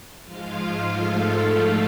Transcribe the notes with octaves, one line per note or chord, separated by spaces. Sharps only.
G#2 F3 G#3 F4 F5
F4 F5
A3 A4